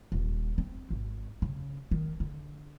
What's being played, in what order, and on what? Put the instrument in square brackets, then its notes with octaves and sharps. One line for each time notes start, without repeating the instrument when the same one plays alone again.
[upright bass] D#1
C4
G#1
C#3
D#3
D3